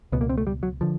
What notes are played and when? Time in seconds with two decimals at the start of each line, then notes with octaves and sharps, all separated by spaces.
0.12 C#2 B2 B3
0.21 A#3
0.29 C4
0.38 A3
0.47 G3
0.63 F#3
0.81 D3 F3